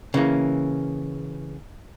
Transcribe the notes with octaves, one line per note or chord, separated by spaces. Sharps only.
C#3 E3 A#3